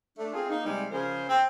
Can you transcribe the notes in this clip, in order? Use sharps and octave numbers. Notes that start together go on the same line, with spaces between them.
A3 D4
C4 F4 G#4
A#3 D#4
C3 G3 G#3
C#3 F3 G#4 A#4 C5
C4